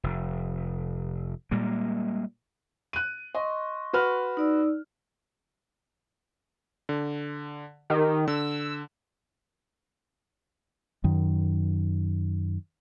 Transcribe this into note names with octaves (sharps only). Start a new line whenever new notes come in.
F1
A#2 G3 G#3 A#3
F#6 D#7
D#5 C6 C#6
F#4 B4 F6
D#4 D5 E6
D3
D#3 G4 D#5
D3 E6
F#2 D#3